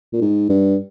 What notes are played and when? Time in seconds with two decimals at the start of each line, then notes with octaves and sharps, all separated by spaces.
0.13 A#2
0.21 G#2
0.49 G2